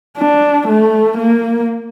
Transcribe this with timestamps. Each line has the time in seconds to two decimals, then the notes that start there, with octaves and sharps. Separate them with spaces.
0.17 D4
0.68 A3
1.18 A#3